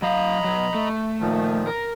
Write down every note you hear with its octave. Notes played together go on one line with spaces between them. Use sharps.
F#3 D#5 F5 A#5 B5
B2 F#3
A3
A#2 D#3 F3
A#4